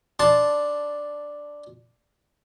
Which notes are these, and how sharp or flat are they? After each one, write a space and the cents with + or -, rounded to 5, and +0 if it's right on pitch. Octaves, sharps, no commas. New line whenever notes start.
D4 +0 A5 -5 C6 +0